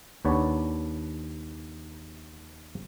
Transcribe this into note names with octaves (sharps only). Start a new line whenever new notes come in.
D#2 D4 B4 C#5 F#5 A5